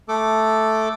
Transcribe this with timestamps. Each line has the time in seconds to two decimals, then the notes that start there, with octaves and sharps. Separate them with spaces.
0.08 A3 A4 D6